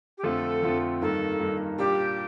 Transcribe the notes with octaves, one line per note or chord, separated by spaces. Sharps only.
G4
F2 D3 A3 C4 F4 A4
F2 D3 A3 C4 F4
G2 D#3 A#3 A4
G2 D#3 A#3
A#2 G3 D4 G4